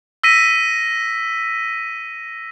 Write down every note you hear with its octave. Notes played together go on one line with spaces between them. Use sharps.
E6 A#6 B6 D#7